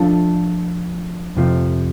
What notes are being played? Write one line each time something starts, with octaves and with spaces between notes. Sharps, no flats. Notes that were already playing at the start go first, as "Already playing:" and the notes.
Already playing: F3 A3 D4 F4 A4
F2 C3 F3 A3